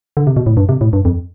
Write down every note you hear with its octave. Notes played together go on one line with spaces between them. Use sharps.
D3
C3
B2
A2
G2
C3
A2
G2
F2